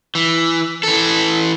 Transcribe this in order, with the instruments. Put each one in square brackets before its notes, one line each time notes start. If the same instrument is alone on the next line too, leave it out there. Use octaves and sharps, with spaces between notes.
[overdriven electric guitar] E3
E3 A4